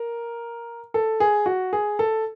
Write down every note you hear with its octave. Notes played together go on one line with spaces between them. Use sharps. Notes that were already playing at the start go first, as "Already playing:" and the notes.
Already playing: A#4
A4
G#4
F#4
G#4
A4